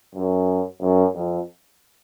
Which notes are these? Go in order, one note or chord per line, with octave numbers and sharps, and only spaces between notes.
F#2
F#2
F2